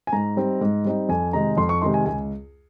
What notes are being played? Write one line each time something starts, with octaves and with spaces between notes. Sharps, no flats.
G#5
G#2 A#5
G3 C4 D#4
G#2
G3 C4 D#4
F2 G#5
C3 D#3 G#3 D#4 A#5
F2 C6
C#6
C3 D#3 G#3 D#4 C6
G#5
C#2 G#5